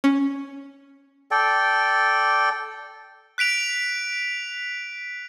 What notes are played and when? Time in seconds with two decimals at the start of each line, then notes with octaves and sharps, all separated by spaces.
0.04 C#4
1.31 A4 D5 G5
3.38 F#6 B6 D7 F7